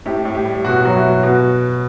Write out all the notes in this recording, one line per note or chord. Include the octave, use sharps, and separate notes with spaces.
A2 G4
A2
G4
G3
B2 F#4
F#3 F#4
E4
B2
B2 F#4